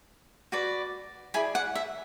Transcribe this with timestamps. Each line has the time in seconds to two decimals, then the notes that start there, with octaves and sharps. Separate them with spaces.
0.52 F#4 B4 D5
1.34 E4 G#4 D5 G#5 B5
1.55 F#5
1.75 E5